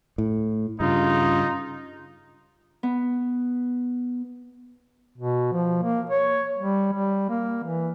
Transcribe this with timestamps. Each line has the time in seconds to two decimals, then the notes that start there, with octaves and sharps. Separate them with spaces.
0.18 A2
0.80 G2 C#3 D#4 F4
2.83 B3
5.18 B2
5.52 F3
5.83 A#3
6.10 C#5
6.58 G3
6.93 G3
7.29 A#3
7.64 E3